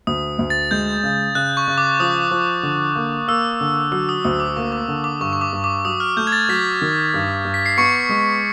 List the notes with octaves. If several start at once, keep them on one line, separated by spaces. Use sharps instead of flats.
D2 D#6
D2
A6
G#3 G6
C#3
C#3 F#6
C#6
C#3
D6
F3 D#6
F3
D3
A#3
A#3 E6
D3
F#3 E6
D#6
D2 D#6
D6
A#3 C#6
D6
D3
D6
G2 C#6
C#6
D6
G2
D6
F#3 D#6
F6
A3 G6
G#6
A6
F#3 B6
D#3
G2
G2
B6
C7
B3 C#6 C#7
G#3